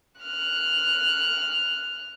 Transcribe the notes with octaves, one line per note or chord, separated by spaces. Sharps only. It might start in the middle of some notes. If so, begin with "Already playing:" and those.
F6 F#6